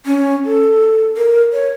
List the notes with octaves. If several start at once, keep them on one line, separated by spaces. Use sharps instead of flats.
C#4
A4
A#4
C#5